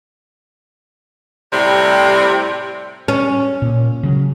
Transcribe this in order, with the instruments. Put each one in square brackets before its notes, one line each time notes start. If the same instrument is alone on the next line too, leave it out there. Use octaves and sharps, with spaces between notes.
[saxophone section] A2 C3 G3
[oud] C#4
[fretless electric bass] A#2
C#3 F#3